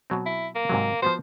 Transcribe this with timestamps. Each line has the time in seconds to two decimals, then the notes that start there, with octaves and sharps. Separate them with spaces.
0.10 B2 F#3 C4
0.26 E4
0.55 A#3
0.69 G#2 C3 F#3
1.02 F3 B3 F#4 C5